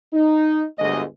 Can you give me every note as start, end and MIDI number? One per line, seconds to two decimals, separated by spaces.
0.13 0.64 63
0.79 1.02 31
0.79 1.02 38
0.79 1.02 56
0.79 1.02 75